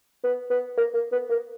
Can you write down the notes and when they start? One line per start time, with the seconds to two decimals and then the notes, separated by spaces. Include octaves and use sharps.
0.24 B3
0.50 B3
0.77 A#3
0.94 A#3
1.12 B3
1.30 A#3